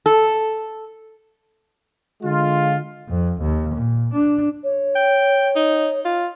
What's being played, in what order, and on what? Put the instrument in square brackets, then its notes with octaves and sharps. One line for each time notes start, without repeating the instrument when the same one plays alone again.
[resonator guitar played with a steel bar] A4
[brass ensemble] D3 G#3 F4
[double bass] F2
D#2
A#2
D4
[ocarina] C#5
[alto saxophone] G5
D#4
F4